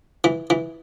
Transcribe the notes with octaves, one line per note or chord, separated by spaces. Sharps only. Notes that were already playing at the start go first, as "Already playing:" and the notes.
E3
E3